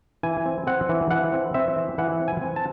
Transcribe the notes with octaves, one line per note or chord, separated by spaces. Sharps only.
E3 G#5
C4
C4 F#5
E3
E3 F#5
C4
C4 E5
E3
E3 F#5
C4
G#5
C4
A5